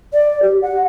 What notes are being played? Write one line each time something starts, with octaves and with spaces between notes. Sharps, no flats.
D5
G4
F#5